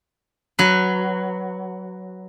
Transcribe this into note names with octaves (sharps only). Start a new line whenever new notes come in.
F#3 B4